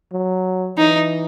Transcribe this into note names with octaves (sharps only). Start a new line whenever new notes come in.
F#3
E3 D#4